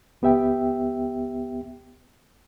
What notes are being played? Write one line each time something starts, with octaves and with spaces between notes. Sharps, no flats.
C#2 B3 G4 E5 G5